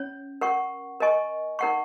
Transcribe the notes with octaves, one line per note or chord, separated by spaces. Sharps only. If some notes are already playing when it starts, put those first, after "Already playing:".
Already playing: C#4 C#5
A#4 F#5 C#6
A#4 D#5 G#5 C#6
D#4 A#4 F#5 C#6